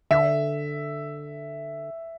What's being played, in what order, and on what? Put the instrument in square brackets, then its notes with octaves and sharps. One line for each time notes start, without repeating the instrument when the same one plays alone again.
[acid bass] D3 [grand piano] E5